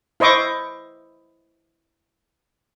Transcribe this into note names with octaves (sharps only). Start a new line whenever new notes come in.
E4 C5 D#5 C#6 D6